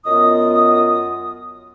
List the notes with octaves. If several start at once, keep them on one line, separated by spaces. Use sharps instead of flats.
F#2 B3 F4 D#5 D#6